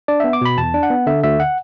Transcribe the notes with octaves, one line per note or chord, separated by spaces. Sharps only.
D4 D5
B3 E5
D6
B2 B5
E2 A5
D4
F#5
B3
D3 E5
D2 E5
F#5